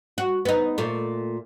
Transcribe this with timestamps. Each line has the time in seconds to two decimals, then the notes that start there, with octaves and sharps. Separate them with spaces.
0.18 F#4
0.45 B3 D#4
0.78 A#2 A3